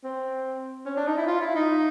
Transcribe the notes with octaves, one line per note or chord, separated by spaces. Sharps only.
C4
C#4
D4
D#4
E4
F4
E4
D#4